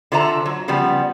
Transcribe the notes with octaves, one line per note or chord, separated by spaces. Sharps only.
D3 F4 C5 E5 A5 A#5
F#3
C#3 F3 G3 B3